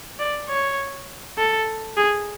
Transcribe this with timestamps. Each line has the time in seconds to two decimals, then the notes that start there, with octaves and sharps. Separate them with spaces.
0.19 D5
0.49 C#5
1.38 A4
1.97 G#4